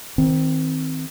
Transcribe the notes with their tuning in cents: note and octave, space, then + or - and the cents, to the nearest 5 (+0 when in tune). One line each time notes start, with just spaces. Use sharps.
D#3 +30 C4 -5